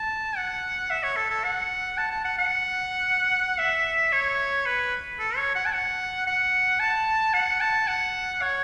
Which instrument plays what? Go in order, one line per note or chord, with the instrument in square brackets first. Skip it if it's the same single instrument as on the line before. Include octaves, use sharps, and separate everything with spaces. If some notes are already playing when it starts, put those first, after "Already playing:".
Already playing: [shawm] A5
F#5
E5
C#5
A4
A4
F#5
A5
A5
F#5
F#5
E5
C#5
B4
A4
C#5
F#5
A5
F#5
F#5
A5
F#5
A5
F#5
C#5